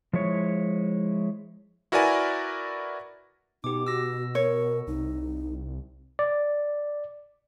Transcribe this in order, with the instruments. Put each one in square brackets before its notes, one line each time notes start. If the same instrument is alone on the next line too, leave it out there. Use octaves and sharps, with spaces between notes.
[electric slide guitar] F3 G#3 E4 C#5
[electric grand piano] E4 F#4 A#4 B4 D5 G#5
[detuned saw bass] B2 [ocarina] D#4 [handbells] G4 D6
[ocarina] F#4 [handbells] E6 A#6
[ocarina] A#4 [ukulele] C#5
[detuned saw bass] C2 [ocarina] D#4
[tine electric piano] D5